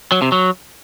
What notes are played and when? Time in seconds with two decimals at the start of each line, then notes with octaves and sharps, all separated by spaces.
0.12 F#3
0.22 C3
0.32 F#3